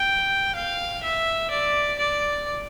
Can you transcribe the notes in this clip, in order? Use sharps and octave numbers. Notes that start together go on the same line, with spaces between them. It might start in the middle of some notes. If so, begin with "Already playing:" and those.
Already playing: G5
F5
E5
D5
D5